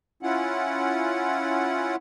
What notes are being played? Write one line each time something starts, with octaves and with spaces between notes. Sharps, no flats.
C#4 E4 F4 F#5